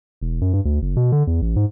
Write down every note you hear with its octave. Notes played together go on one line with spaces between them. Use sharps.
E1
F#2
G2
D2
F#1
B2
D3
E2
A1
G#2